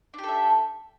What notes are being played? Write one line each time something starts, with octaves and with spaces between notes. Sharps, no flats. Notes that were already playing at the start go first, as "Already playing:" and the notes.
D4 G4 A4 E5